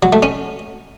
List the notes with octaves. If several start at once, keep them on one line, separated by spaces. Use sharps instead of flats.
F#3
A3
C#4